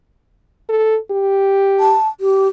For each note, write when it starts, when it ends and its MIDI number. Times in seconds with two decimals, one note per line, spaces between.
0.69 0.98 69
1.11 1.96 67
1.80 2.08 81
2.21 2.48 67